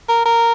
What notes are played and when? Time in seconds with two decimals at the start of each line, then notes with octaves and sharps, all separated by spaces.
0.09 A#4
0.25 A#4